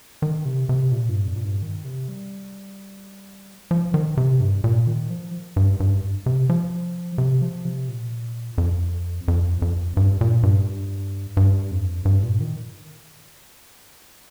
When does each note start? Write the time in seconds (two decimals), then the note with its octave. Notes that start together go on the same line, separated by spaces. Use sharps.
0.22 D#3
0.45 C3
0.69 C3
0.92 A#2
1.09 G2
1.27 F2
1.36 A#2
1.45 G2
1.62 D#3
1.85 C3
2.08 G3
3.71 F3
3.94 D#3
4.17 C3
4.40 G2
4.64 A#2
4.87 D#3
5.10 F3
5.56 G2
5.80 G2
6.26 C3
6.50 F3
7.18 C3
7.42 F3
7.65 C3
7.88 A#2
8.58 F2
9.28 F2
9.62 F2
9.97 G2
10.21 A#2
10.43 G2
11.37 G2
11.71 F2
12.05 G2
12.23 A#2
12.41 D#3